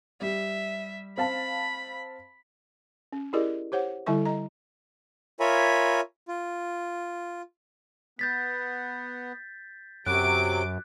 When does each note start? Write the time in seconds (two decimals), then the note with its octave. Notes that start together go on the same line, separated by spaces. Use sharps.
0.22 G3 E5
1.18 C4 F5 A5 B5
3.13 C#4
3.33 E4 G4 G#4 A#4 D5 D#5
3.72 G4 C5 C#5 F#5
4.06 D3 G3 E4 A4 E5 C#6
4.25 D#5 A#5
5.40 F4 A#4 C#5 E5 G#5 B5
6.28 F4
8.19 B3 G6 A6 B6
10.06 F#2 C3 F#3 D6 F#6 D7